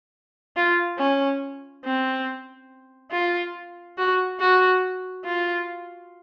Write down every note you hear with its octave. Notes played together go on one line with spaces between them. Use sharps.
F4
C#4
C4
F4
F#4
F#4
F4